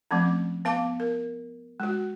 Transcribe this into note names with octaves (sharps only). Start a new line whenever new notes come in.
F3 A3 C4 C#4
B3 F5 A5 D6
A#4
G#3 F#4